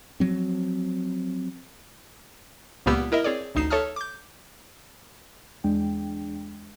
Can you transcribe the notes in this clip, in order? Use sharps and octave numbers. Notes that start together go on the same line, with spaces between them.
F3 F#3 C4
C#2 A#2 A#3 B3 G4 E6
E4 A#4 D#5 E5
C4 G#4 C#5 D5
A1 D2 D#4 C7 E7
A4 C#5 E5 A5 D#6 F6
D6 G6
E2 G#3 D4 G5